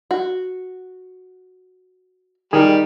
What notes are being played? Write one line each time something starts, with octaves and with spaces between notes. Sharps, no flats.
F#4
D#3 G3 G#4 A#4